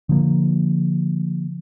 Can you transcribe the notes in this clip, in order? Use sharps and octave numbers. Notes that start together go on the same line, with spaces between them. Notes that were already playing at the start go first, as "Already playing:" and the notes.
D3 F3 A#3